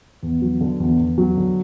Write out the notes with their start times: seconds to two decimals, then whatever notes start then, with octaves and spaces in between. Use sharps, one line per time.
0.23 E2
0.42 F#3
0.61 D3
0.80 E2
1.00 E2
1.18 F#3
1.37 D3